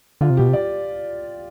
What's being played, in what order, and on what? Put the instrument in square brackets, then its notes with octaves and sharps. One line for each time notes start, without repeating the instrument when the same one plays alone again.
[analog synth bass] D3 [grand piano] F4
[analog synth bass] C3
[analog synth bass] B2 [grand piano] G4
[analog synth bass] C3
[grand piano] D5